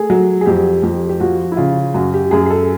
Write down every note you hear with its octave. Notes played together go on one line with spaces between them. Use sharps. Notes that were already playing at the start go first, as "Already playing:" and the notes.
Already playing: A3 G#4
F#3
G#4
F2 G4
F2 G4
G4
F3 F#4
E4
C#3 F4
F#2 F#4
G4
F#2 G#4
G#4
A4